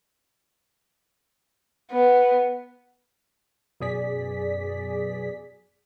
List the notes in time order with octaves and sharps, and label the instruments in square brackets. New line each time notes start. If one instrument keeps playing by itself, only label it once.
[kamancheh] B3
[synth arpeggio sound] F#2 B2 G#4 D5 B6